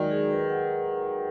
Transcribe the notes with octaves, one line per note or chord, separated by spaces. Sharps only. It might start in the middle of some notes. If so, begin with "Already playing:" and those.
Already playing: D#3 F#3 G#3 D#4 F#4 D5
G#4
B4
F#5